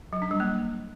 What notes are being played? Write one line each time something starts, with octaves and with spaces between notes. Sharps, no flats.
F#3
D4
G3
A#3